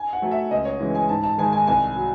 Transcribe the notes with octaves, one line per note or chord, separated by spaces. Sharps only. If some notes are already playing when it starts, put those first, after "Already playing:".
Already playing: G#5
F#5
F#3 A3
E5
C#2 D#5
C#5
C#3 E3 G#3
G#5
G#2 A5
A5
D#3 G#3 G#5
G#5
C2 G#5
F#3